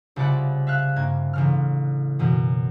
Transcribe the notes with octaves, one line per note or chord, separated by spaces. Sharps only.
C2 C#3 F4 D5 F#5 B5
E5 F5 F6 F#6
G2 A#3 G#6
A1 C#3 F6
F#2 B2 E3